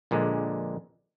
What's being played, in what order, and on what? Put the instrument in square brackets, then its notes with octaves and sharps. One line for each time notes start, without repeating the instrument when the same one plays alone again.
[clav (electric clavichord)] A#1 A#2 D3 G#3